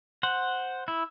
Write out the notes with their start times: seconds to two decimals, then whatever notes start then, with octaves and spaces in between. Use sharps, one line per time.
0.23 C5 F#5
0.88 E4